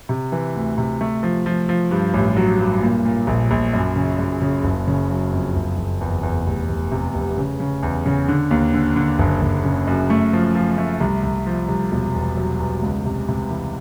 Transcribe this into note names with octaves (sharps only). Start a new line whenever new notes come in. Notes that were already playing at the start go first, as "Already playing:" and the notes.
C3
E3
D2
C3
A3
F3
F3
F3
G2
A1
F#3
G2
A#2
A#2
A#1
A#1
F#2
C#3
F#2
C#3
F#1
C#3
F#3
F2
F#1
F#1
E2
E2
F1
F1
C3
F1
C#3
C#3
E2
C#3
D3
D#2
D3
D3
F#1
F#1
C#3
F#2
A3
F3
F3
A3
C2
C2
F3
C2
E1
E2
F#3
E2
C#2
C3
C3
E3